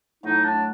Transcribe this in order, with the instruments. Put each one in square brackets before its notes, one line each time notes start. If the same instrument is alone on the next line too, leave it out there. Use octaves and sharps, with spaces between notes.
[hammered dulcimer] A2 F#3 A3 [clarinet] D#4
[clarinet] D4